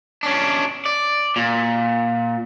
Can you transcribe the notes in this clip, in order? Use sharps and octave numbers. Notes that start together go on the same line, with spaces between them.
C#4 D4
D5
A#2